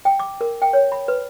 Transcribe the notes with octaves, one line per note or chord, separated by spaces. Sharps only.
G5
D6
A#4
G5
C#5
B5
B4